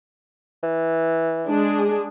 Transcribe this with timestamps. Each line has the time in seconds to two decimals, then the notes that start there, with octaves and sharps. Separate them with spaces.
0.63 E3
1.46 G#3 D4 G#4